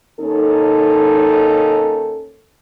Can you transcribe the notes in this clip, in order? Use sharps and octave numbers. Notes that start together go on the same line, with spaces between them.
D#2 C#4 D#4 A4